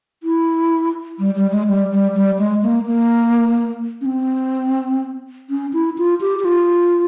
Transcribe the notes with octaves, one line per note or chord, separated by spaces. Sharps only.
E4
G3
G3
G#3
G3
G3
G3
G#3
A#3
A#3
C#4
C4
C#4
E4
F4
G4
G4
F4